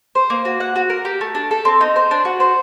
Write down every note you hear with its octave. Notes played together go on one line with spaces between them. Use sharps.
C5
A#3
F#4
F#5
F#4
A#4
G4
A3
D4
A4
C4
D#4
C5
D4
F#4
C5